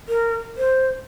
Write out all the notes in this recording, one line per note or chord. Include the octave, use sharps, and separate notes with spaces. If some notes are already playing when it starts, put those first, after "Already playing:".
A#4
C5